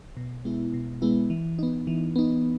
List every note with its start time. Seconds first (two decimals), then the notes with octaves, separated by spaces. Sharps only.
0.17 B2
0.45 G#3 B3 E4
0.74 B2
1.02 G#3 B3 E4
1.30 E3
1.59 B3 D#4
1.87 E3
2.16 B3 D#4